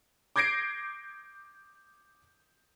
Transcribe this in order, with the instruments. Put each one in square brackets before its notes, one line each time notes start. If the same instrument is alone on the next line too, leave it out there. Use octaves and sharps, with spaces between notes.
[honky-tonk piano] D6 G6 G#6 A#6 C7 D7